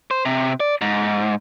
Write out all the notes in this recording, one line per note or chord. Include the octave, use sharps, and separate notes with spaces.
C5
C3
D5
G#2